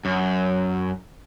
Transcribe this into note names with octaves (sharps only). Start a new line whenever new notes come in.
F#2